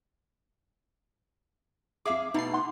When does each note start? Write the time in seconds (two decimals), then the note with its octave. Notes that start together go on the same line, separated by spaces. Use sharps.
2.05 F2 G#4 E5 F5 D6
2.34 B2 A3 B3 D#4 A6 C7
2.53 F#5 C6